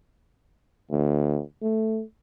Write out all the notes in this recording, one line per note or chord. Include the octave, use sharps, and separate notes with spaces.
D2
A3